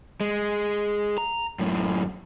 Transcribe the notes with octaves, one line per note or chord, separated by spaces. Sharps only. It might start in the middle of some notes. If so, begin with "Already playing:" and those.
G#3
A#5
F#2 A2